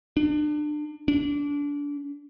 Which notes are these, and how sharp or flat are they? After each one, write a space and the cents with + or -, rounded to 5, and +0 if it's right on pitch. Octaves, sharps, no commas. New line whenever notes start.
D4 +30
D4 -25